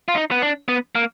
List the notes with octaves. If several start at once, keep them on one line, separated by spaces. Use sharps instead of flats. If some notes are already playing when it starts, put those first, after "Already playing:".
F4
D#4
B3
D4
B3
A#3